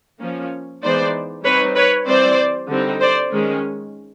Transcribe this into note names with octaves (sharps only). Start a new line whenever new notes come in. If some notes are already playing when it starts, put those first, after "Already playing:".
F3 A#3 C#4
E3 G#3 B3 D#4 C5 D5
G3 C4 D#4 B4 C#5
B4 C#5
E3 G3 C4 C5 D5
D3 G3 C4 D#4
C5 D5
D#3 G#3 C#4